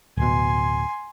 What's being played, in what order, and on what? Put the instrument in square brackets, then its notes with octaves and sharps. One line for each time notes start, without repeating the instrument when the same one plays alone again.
[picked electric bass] D1 B2 [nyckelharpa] G#5 C6